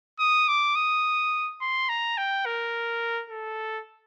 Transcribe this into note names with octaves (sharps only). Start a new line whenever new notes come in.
D#6
D6
D#6
C6
A#5
G5
A#4
A4